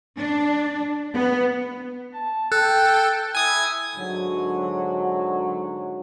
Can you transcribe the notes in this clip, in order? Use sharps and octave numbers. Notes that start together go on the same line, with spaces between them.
D4
B3
A5
A4 G5 F#6
E4 G#5 D#6 G#6
G#2 D3 F#3